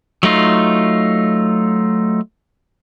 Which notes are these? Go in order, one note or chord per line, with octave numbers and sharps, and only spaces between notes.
F#3 A3 D#4 F4